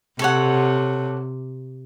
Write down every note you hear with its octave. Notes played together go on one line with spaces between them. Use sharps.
C3 A4 C#5 F#5